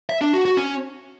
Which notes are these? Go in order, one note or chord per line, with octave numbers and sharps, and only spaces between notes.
E5
D4
F#4
F#4
C#4